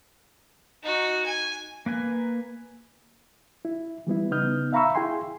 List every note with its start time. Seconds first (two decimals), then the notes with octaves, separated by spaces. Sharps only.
0.83 D#4 F#4
1.26 G#5
1.86 A#3 B4 G#5
3.65 E4
4.07 E3 G3 B3 E4
4.31 C#3 B3 D#4 D#6 F6 G6
4.73 E5 F5 A#5 B5 C#6 E6
4.95 E4 G#4 G5 G#5 C6